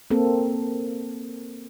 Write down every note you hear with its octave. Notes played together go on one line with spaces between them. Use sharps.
A#3 C4 A4